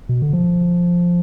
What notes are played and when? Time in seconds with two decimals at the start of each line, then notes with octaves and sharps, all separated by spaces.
0.09 B2
0.22 D3
0.33 F3